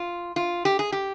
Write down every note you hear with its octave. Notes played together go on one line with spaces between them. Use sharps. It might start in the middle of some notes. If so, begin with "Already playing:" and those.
Already playing: F4
F4
G4
G#4
G4